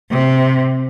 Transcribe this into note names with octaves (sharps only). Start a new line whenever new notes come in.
C3